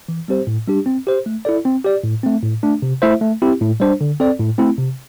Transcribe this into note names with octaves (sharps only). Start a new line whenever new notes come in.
E3
G3 C4 G4 C5
A2
G3 D4 G4
C4
G4 C5
A3
E4 A4 D5
C4
G4 D5
A2
A3 C4
A2
A3 D4
C3
A3 E4 C5 E5
A3
C4 E4 G4
A2
G3 D4 C5
D3
C4 A4 D5
A2
A3 C4 E4
C3